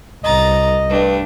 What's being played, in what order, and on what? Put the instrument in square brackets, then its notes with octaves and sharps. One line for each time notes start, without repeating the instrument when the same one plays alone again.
[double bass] C2 [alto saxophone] D#5 [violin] A#5 A6
[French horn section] G2 [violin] A3 D4